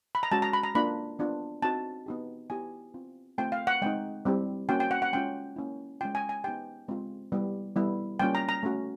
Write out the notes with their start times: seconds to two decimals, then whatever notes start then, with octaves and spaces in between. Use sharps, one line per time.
0.15 B5
0.23 A#5
0.31 G#3 C#4 F#4 A5
0.42 A#5
0.53 B5
0.63 A#5
0.75 A#3 D4 F4 B5
1.19 B3 D4 F4
1.62 C4 D#4 F#4 A5
2.06 B3 D#4 G4
2.50 B3 E4 G4 G#5
2.94 C4 F4
3.38 A3 C4 F4 G5
3.52 F5
3.67 F#5
3.82 G#3 C4 D#4 G5
4.25 G3 C4 E4 G4
4.69 A#3 C#4 F#4 G5
4.80 G5
4.91 F#5
5.02 F#5
5.13 G#3 C#4 F4 G5
5.56 A#3 C#4 E4
6.01 G#3 C#4 F4 G5
6.15 G#5
6.29 G#5
6.44 B3 D#4 G4 G5
6.88 G#3 C4 F4
7.32 G3 B3 E4 G4
7.76 G3 B3 E4
8.19 G3 A#3 C#4 F4 G5
8.35 A#5
8.49 A#5
8.63 A3 C#4 F#4